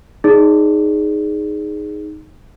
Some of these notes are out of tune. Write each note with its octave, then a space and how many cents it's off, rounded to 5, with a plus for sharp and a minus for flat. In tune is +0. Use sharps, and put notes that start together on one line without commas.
D#4 +0 G#4 +0 D5 -25